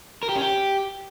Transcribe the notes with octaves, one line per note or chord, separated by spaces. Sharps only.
A#4
G4
C#4
G4